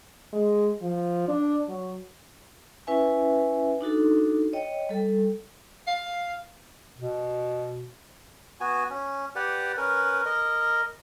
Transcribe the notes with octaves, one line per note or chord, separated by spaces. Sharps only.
G#3
F3
D4
F#3
C#4 E4 B4 E5 G#5
D4 D#4 F#4 A4
C#5 D#5 G5
G3 A4
F5
B2
B3 F#4 G#5
C#4
G4 B4 D5 F#5
C#4 A#4 B4
A#4 D#5